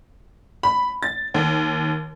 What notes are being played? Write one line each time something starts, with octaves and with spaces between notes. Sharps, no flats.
B5
A6
D#2